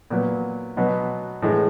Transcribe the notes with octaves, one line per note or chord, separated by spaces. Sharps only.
A#2 F#3 B3
B2 F#3 B3
A2 E3 G#3